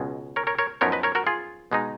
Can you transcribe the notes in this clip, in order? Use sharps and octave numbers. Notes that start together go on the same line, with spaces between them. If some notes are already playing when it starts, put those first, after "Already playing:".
Already playing: C#2 B2 G#3
A#4 C#5
A#4 C#5
A#4 C#5
F#2 F3 B3 D#4 A#4 C#5
B4 D#5
A#4 C#5
F#4 A#4
F4 G#4
B2 G#3 D#4